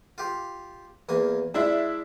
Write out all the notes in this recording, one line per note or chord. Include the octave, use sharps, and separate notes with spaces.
F4 G4
E2 A#3 G#5
G#3 D4 E4 E5